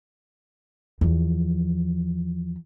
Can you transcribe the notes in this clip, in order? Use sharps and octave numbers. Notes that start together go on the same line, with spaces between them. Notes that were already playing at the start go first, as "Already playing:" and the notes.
E2 F3